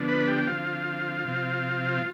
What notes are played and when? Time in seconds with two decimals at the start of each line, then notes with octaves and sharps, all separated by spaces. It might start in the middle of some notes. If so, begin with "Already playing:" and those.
Already playing: D3 F3 B3 D4
0.08 B4 B5
0.27 G4 G5
0.47 D3 F3 C4 F4 F5
1.25 C3 F3 C4
1.93 F5